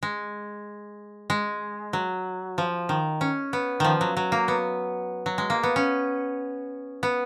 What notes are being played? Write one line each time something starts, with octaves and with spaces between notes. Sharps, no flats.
G#3
G#3
F#3
F3
D#3
C#4
B3
D#3 F3
F#3
F#3
A#3
B3
F#3
G#3
A#3
B3
C#4
B3